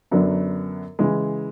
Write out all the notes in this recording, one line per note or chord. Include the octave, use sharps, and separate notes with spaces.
F#2 D3 F#3 B3 D4
C#3 E3 G#3